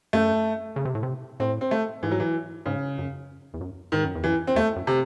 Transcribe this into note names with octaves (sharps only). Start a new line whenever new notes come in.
F#2 A3
C#3
C3
A2
C3
A2 C4
C4
A3
G#2 E3
F#3
E3
G#2 C#3
F#2
E2
F#2
G#2 D#3
F#2
E2
F#2 E3
C4
E2 A3
F#2
C3